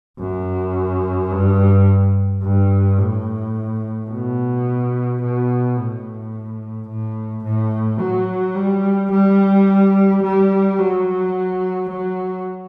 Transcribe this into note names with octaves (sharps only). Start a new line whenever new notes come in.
F#2
G2
G2
A2
B2
B2
A2
A2
A2
F#3
G3
G3
G3
F#3
F#3